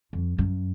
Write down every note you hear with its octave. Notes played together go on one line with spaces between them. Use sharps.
F2
F#2